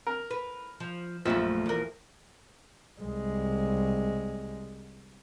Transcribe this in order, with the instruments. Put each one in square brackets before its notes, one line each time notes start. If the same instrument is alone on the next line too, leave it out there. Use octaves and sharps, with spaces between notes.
[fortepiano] A#4
[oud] B4
F3
[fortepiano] A#1 F3 [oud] F#2 A3 E5
[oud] E2 A#4
[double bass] C2 G#3